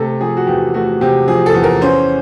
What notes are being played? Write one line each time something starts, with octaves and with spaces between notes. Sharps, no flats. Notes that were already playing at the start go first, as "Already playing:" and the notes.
Already playing: C3 A3 A4
F3 G#4
F#4
E2 G4
A3 F#4
C3 G4
F3 G#4
A4
E2
A#4
C#4 C5